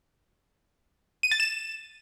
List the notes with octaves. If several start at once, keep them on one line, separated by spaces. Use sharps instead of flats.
D#7
A6
E7